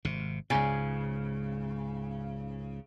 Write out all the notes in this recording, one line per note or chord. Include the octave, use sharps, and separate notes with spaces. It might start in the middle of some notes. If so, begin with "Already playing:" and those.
G#1 C3
C#2 G#2 C#3